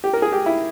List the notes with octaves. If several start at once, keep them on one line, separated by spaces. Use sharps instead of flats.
G4
A#4
G#4
G4
E4